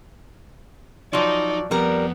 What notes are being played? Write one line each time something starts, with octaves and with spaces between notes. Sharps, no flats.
F3 F#3 D#4 D5
F2 G3 B3 A#4